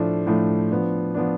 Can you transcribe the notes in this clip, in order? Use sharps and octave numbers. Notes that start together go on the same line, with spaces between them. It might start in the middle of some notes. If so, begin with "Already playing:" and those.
Already playing: A2 F3 A3 D4
A2 F3 A3 D4
F3 B3 D4
F3 B3 D4